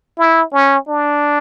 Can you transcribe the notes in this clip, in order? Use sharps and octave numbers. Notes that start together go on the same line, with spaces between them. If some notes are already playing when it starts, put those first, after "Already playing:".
E4
C#4
D4